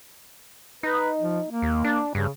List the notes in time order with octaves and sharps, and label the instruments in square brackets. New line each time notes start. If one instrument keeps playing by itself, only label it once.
[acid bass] D#4 [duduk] B4
[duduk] F3
A#3
[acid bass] D#2
D4
[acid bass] G2 [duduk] C#3